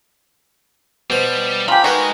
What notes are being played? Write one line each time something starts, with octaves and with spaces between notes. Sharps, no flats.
B2 G3 C5
F4 G4 G#5 A#5 B5 F7
G#3 D#4 F#4 A#4 B4 C#6 D6